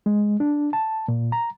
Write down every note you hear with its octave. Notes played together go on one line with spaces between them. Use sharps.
G#3
D4
A5
A#2
A#5